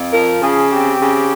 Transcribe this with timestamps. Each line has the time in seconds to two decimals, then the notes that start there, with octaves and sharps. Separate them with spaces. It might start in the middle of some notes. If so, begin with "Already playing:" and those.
Already playing: F2
0.11 F3 A#4
0.41 C#3 G#4
0.70 C4 G4
0.99 C#3